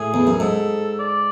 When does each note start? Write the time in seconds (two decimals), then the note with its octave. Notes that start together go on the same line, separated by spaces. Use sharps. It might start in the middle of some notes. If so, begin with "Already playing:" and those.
Already playing: A2 G#4
0.14 E2
0.27 F#2
0.40 G#2 A4
0.99 D5